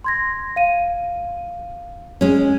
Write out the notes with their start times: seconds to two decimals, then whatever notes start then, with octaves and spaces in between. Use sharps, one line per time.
0.04 C6 G#6 A#6
0.56 F5 D#7
2.21 G#3 C#4